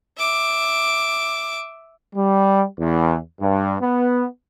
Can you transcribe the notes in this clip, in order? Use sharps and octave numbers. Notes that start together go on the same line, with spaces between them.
E5 D6
G3
E2
G2
B3